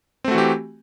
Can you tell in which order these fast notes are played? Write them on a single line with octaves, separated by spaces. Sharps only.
C4 A3 F#4 E3 G4